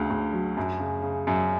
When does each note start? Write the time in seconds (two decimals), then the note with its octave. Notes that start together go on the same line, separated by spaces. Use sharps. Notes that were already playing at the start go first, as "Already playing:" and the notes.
Already playing: D2 C#3
0.10 D2
0.33 F#3
0.57 F#2
0.80 C#3
1.03 C#3
1.27 F#2